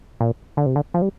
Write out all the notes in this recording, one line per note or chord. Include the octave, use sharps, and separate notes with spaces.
A#2
D3
C3
D3
F3
G3